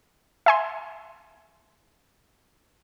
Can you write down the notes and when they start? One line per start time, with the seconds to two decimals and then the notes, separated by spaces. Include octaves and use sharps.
0.46 E5 G#5 C6